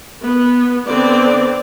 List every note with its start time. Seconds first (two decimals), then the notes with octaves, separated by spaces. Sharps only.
0.23 B3
0.87 D3 B3 C4 D5